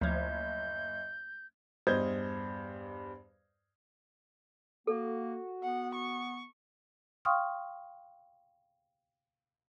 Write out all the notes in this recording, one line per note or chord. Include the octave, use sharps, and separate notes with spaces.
F#1 D2 F3 D#5 G6 G#6
E2 G2 C5 D#5 G6 G#6
A#3 F#4 A4
B3 F#5
C#6
F5 G5 C6 C#6 D#6 F6